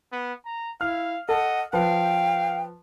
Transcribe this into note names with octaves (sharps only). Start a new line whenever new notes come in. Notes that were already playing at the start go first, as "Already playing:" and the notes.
B3
A#5
E4 F5 F6
A4 D#5 F#5
F3 B4 F5 G5